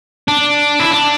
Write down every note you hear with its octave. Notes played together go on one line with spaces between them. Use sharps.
D4
E4
D4